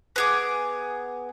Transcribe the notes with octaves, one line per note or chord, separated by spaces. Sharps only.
B3 G#4 D6